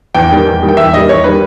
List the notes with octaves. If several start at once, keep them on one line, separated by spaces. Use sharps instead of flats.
E2 G5
D#3 G3
E2
D#3 G3
G5
E2 E5
D#3 G3 D#5
E2 C#5
D#3 G3 B4